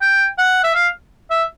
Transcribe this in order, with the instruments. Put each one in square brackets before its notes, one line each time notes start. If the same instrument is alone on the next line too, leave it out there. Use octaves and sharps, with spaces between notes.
[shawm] G5
F#5
E5
F5
E5